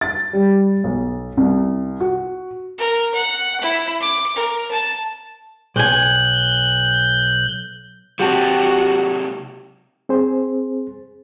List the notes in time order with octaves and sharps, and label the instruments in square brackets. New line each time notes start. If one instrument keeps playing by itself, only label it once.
[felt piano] A6
G3
B1
C2
F#4
[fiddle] A#4
F#5
E4
D6
A#4
A5
[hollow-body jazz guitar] B1 G#5 [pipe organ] F#6 G6
[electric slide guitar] C3 F#3 [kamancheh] F#4 [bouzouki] G4 A5
[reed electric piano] C4 G#4 C5